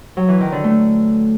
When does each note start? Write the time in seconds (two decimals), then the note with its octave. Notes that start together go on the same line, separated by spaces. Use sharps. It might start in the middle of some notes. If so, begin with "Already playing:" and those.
0.17 F#3
0.29 E3
0.40 D#3
0.52 D3
0.64 A3